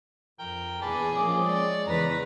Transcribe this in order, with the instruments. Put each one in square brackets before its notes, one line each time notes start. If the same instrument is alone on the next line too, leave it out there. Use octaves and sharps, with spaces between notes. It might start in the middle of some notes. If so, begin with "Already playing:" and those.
[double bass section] F2 [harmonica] A#4 G5
[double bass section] E2 A#2 [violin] G#4 [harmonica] B4 D5 A5
[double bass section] F3 A#3 C#4 [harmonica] C4 D#5 D6
[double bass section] G#3 [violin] C#5 D5
[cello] E2 B4 [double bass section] C#3 [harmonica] A#5